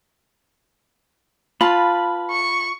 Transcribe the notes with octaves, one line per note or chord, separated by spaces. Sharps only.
F4 B4 A5 B5
C#6